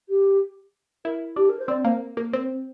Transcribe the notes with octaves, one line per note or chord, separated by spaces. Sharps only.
G4
E4 A#4
D4 G4
A#4
C5
C4 D5
A#3 C5
A#3
C4